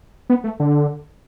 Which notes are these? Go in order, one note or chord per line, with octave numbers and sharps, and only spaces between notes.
B3
A3
D3